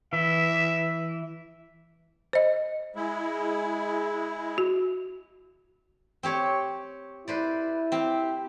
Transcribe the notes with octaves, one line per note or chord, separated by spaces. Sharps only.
E3 E5
C5 D#5
G#3 E4
F#4
C4 G4 C#5
E4 B4 C5 D5
C4 G4